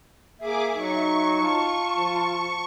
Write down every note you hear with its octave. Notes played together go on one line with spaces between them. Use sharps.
A#3 G#4 E5 D6
F#3 D#4 C#6
F4 A5
F3